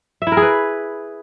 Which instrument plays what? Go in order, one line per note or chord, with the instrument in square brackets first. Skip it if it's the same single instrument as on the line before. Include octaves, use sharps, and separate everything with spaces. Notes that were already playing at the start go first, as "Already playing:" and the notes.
[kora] E5
E4
A#4
G#4
B4